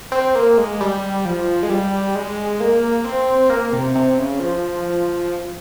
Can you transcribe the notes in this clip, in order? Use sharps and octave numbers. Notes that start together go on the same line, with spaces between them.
C4
A#3
G#3
G3
F3
G#3
G3
G#3
A#3
C4
A#3
C3
C3
C#3
F3